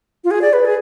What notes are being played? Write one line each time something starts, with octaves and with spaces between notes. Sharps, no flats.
F4
G#4
D5
B4
G#4